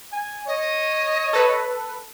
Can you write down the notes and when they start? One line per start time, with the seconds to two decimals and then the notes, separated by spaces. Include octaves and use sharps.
0.12 G#5
0.47 C#5 D#5
1.33 A4 B4